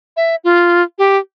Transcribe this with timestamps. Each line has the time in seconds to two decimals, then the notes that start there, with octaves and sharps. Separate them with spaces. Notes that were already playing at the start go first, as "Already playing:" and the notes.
0.17 E5
0.44 F4
0.98 G4